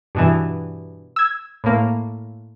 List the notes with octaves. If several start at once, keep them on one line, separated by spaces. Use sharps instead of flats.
G2 B2 E3
E6 G#6
A2 A#3